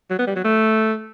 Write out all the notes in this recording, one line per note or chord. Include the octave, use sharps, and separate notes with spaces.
F#3
B3
G3
F#3
A3